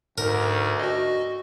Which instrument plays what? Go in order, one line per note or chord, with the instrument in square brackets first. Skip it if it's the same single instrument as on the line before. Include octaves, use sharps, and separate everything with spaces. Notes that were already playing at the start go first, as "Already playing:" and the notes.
[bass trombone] D2 [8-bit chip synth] G#2 [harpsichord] A#4
[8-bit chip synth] F#4 D#5